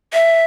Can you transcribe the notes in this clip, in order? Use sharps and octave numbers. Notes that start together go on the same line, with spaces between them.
E5